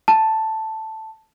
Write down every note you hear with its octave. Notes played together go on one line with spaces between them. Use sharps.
A5